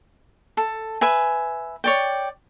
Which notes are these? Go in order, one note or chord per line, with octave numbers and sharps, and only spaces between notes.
A4
B4 E5 G#5
C#5 D5 G5